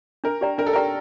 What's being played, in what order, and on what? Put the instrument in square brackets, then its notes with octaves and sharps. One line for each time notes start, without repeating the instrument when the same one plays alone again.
[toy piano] D4 [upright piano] A#4
[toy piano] G4 D5 G5 A#5
[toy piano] D4 [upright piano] A#4
[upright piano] A4
[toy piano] G4 D5 G5 A#5 [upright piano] A#4